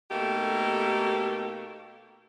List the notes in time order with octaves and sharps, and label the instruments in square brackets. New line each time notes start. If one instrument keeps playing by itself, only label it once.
[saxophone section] B2 A3 A#3 D#4 G4 A4